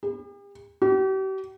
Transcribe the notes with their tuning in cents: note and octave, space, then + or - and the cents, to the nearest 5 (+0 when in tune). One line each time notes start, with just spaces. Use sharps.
G4 +45
G4 -40